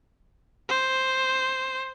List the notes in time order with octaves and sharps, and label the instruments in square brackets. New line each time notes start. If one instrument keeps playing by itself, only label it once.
[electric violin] C5